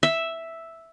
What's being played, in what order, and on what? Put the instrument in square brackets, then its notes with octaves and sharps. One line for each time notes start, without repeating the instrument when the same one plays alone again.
[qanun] E5